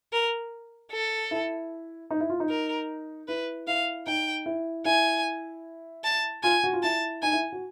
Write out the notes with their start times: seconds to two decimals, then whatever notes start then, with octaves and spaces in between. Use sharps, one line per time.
0.13 A#4
0.91 A4
1.31 E4
2.10 D#4
2.20 E4
2.30 F4
2.40 D#4
2.50 A#4
3.28 E4 B4
3.67 E4 F5
4.07 D#4 G5
4.46 E4
4.85 E4 G#5
6.04 A5
6.43 F4 G#5
6.64 F#4
6.73 F4
6.83 E4 A5
7.22 D#4 G#5
7.33 E4
7.52 F#4